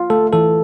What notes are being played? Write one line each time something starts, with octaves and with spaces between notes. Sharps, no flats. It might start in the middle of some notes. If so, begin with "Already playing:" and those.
Already playing: F4
A3 A4
E3 A4